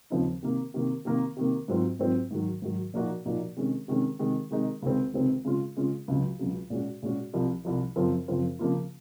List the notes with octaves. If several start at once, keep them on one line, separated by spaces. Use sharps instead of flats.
D#2 C#3 F3 C4 D#4
C3 D#3 A#3
C3 D#3 A#3
C3 D#3 A#3
C3 D#3 A#3
G#2 F#3 C4 F4
G#2 F#3 C4 F4
G#2 D#3 F#3
G#2 D#3 F#3
A#2 F3 A#3 D#4 F#4
A#2 F3 A#3 D#4 F#4
C3 D#3 G#3 C#4
C3 D#3 G#3 C#4
C3 D#3 G#3 D#4
C3 D#3 G#3 D#4
C#2 C3 D#3 G#3 C4
C#2 C3 D#3 G#3 C4
C#3 G#3 C#4 F4
C#3 G#3 C#4 F4
C#2 C#3 F#3
C#2 C#3 F#3
A#2 G#3 C#4 F#4
A#2 G#3 C#4 F#4
C2 C3 F3
C2 C3 F3
F#2 C#3 F3 C4 F4
F#2 C#3 F3 C4 F4
C#3 F3 A#3 F4